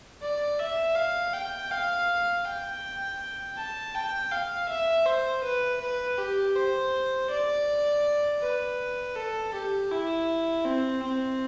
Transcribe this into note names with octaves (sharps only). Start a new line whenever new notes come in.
D5
E5
F5
G5
F5
G5
A5
G5
F5
E5
C5
B4
B4
G4
C5
D5
B4
A4
G4
E4
C4
C4